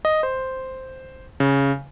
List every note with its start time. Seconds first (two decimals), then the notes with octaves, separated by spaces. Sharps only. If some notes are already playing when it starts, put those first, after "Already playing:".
0.05 D#5
0.23 C5
1.40 C#3